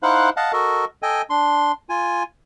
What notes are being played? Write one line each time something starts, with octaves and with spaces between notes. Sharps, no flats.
D#4 E4 C5 F5 F#5 F#6
D#5 F5 F#5 A5
F#4 A4 A#4 D#5
A4 D#5 G5 G#5
D4 C6
F4 G#5